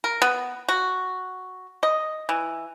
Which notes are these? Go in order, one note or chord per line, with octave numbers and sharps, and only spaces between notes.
A#4
B3
F#4
D#5
E3